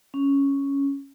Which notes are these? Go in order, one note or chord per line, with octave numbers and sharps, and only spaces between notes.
C#4